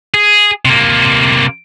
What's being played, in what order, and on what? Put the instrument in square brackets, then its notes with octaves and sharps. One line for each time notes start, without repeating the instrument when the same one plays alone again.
[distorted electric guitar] G#4
C3 A#3